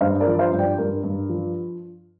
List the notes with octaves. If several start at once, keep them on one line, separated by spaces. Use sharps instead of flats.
G2 C5 F5
A#4 D5
F3
C5 F5
G2
D5 G5
G2 A#4
G2
F3